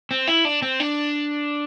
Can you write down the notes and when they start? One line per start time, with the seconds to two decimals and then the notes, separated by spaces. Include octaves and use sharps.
0.11 C4
0.27 E4
0.45 D4
0.62 C4
0.80 D4